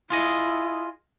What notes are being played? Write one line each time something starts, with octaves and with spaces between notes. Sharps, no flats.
E4 F4 G#4 D#5